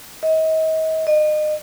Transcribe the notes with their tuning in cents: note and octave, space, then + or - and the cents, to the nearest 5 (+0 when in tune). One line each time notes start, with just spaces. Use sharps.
D#5 +40
D#5 -35